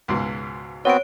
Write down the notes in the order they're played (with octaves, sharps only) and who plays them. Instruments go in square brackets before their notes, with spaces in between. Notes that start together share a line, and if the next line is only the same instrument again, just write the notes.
[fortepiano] C#2 G#2 B2
[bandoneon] B3 C4 F#4 [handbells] C#5 D7